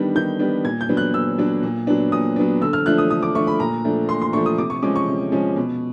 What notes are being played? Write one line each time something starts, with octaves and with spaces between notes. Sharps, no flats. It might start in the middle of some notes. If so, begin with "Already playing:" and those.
Already playing: D#3 G3 B3 D4
D#3 G6
G3 B3 D4
A#2 G#6
G6
F#3 B3 D4
F#6
A#2 E6
F#3 B3 D4
A#2
F#3 B3 D4
A#2 D#6
F#3 B3 D4
D3 E6
F6
F3 A3 D4 F#6
D#6
D3 D#6
D6
F3 A3 D4 C#6
B5
A#2 A#5
F3 A3 D4
A#2 C6
C6
F3 A3 D4 C#6
D#6
C3 D6
C#6
F3 G#3 C#4 D6
C#6
C3
F3 G#3 C#4
B2